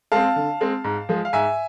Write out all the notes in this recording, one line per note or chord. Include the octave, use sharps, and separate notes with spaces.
G#3 C4 F5 A5
D3
G#3 C4
G#2
F3 G#3
F5
G#2 E5 G#5